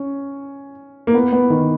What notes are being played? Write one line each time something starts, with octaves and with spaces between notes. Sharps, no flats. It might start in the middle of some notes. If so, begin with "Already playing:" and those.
Already playing: C#4
A#3
B3
B3
D#3